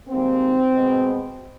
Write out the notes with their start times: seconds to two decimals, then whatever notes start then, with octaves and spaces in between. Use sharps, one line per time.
0.08 G#2 D#3 G3 A#3 C4
0.71 B2 G#3